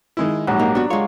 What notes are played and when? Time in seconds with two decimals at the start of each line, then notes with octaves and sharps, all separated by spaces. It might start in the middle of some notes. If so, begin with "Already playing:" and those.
0.17 D#3 G#3 E4
0.47 A#1 G#2 F#3 G4
0.59 A#3 D#4
0.75 B3 D4 F#4
0.90 G#3 F4 C#5